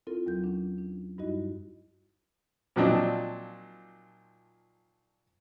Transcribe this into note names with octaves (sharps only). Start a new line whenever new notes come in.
C4 E4 F4 A4 A#4
D#2 F#3 G6
C#4 D4
D4
G2 G3 D#4 E4 F#4 D#5
A#2 F3 F#3 C4 D4 D#4